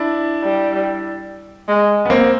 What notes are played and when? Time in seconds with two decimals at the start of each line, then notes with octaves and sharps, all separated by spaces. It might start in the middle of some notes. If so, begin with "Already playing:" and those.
Already playing: D4 E4
0.43 G3
1.68 G#3
2.05 B3
2.10 A#3 C4